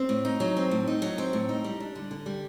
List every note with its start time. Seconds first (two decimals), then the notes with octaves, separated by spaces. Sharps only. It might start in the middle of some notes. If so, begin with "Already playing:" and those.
Already playing: C4
0.09 A2
0.25 D#4
0.40 F#3
0.57 C4
0.71 A2
0.88 D#4
1.02 F#3
1.18 C4
1.33 A2
1.49 D#4
1.64 G3
1.80 D4
1.95 D3
2.11 D3
2.26 G3